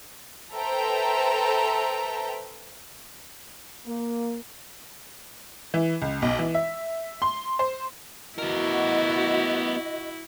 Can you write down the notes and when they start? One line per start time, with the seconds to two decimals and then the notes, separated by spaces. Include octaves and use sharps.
0.54 A4 B4 C5 E5 G5 A#5
3.86 A#3
5.74 E3
6.02 C#2
6.22 B1
6.39 E3
6.54 E5
7.22 C6
7.59 C5
8.38 B3 E4 F#4 A#4 D#5